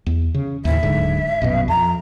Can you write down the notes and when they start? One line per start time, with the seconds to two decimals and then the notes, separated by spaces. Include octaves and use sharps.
0.06 E2
0.35 C#3
0.65 D#2 A2 E5
0.83 D1 G#2 D3
1.42 A#1 F#2 B2
1.68 F2 A#5